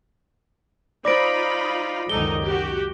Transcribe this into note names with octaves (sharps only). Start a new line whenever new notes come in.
D#4 F4 C5 D5 B5 D6 A#6 D7
C#2 F#2 D#3 D#4 A4 G7
F#4 G4